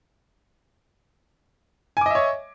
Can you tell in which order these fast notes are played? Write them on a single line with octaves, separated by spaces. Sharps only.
G#5 D6 D#5 E5 C#5